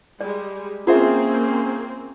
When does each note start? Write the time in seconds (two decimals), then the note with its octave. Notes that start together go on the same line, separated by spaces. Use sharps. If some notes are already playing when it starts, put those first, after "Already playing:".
0.21 G3 G#3 D5
0.87 A#3 C4 C#4 F4 G#4 C5 E5